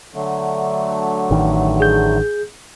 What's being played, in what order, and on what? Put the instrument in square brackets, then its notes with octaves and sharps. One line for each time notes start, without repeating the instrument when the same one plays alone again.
[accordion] D3 F#3 A3
[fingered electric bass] A1 D#3
[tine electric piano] G#4 G6